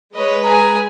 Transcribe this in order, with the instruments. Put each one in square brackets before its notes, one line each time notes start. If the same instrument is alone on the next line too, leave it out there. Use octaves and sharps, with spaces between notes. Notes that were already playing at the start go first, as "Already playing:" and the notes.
[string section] G#3 B4 [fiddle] C#5 D#5
[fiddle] G#4 G#5 [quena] A#5